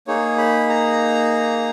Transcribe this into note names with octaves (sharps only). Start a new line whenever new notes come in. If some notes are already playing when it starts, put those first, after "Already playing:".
A#3 D#4 G#4 C#5
B5
A#5